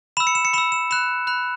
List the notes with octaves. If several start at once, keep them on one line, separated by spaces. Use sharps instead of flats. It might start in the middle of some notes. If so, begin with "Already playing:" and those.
B5 E6 E7
C#7
E7
C#7
B5 E6 E7
E7
B5 F#6 E7
B5 F#6